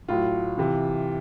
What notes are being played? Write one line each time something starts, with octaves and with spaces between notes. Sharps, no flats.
A2 F#3 F4
C3 E3